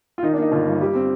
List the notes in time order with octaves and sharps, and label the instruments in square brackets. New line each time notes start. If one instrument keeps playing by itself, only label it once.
[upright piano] F4
D#3 D#4
D4
A#3 D#4
G1 F4
G2
G3 G4
C4